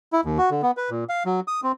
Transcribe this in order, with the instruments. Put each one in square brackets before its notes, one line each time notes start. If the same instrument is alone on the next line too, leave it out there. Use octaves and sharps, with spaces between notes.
[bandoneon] E4
D#2
F#4
D3
B3
B4
A#2
F5
F#3
D#6
C4